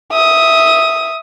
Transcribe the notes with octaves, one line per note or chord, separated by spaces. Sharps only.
E5 D#6